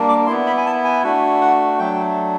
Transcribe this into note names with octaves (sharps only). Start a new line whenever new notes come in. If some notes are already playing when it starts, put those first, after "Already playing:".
Already playing: G3 A#3 D4
D6
B3 E4 C6
B5
G#5
A5
G#5
A3 D4 F#4
F#5
F#3 A3 D4 G5